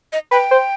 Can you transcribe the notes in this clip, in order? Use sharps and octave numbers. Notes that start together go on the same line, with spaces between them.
D#5
B4 G5
C5